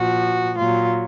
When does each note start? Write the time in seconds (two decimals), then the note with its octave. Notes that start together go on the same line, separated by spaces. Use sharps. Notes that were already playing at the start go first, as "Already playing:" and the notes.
Already playing: A#2 F3 F#4
0.57 A#2 F#3 F4